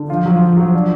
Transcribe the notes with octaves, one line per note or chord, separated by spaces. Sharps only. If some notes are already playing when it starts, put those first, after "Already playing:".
Already playing: D3
F3 F4
F#3
F#3
F#3
D4